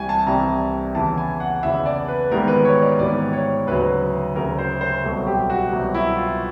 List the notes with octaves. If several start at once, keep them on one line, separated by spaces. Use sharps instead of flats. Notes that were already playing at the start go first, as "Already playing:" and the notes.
Already playing: C2 C3 E3 G3 G#5
A5
C2 C3 E3 G3 A#5
E2 C#3 E3 A5
G#5
F#5
E2 C#3 E3 E5
D5
B4
G#1 G#2 E3 G3 B3 A#4
B4
C#5
D5
G#1 G#2 E3 G3 B3 D5
C#5
D2 C#3 F#3 B4
D2 C#3 F#3 A#4
C5
C5
C2 B2 F#3 A4
G4
F#4
C2 B2 F#3
E4
F4